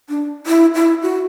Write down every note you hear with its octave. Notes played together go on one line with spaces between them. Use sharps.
D4
E4
E4
F#4